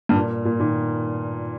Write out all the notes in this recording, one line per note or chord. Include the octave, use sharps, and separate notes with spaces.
G2
A#2
A#2
A#2 D#3